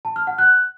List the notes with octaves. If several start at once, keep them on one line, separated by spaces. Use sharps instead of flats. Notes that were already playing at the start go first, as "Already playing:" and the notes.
A5
F6
F#5
F#6